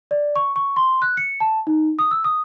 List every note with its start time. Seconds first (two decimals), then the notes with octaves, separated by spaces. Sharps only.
0.11 D5
0.36 C#6
0.56 C#6
0.76 C6
1.02 F#6
1.17 C#7
1.40 A5
1.67 D#4
1.99 D#6
2.11 E6
2.24 D#6